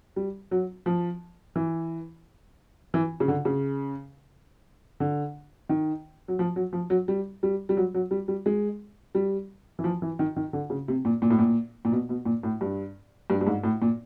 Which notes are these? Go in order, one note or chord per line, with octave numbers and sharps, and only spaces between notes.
G3
F#3
F3
E3
E3
C#3
D3
C#3
D3
D#3
F#3
F3
F#3
F3
F#3
G3
G3
G3
F#3
F#3
G3
G3
G#3
G3
E3
F3
E3
D#3
D#3
D3
C#3
C3
A#2
A#2
A2
A#2
A#2
B2
B2
A#2
A2
G2
G2
G2
G#2
A2
A#2